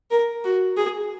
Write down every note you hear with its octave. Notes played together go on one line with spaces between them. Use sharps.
A#4
F#4
G#4